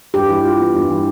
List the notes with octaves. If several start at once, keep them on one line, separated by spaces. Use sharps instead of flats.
G2 G4
E3
F4
B3
G2
E3